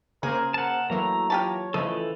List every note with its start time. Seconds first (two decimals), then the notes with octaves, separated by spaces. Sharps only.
0.23 C#3 A#3 G#4 A#4 C5
0.54 A#4 F#5 A5
0.90 E3 F#3 A3 A#3 A#5
1.30 F4 G4 C#5 A5
1.74 C#3 E3 F3 A3 A4 D#5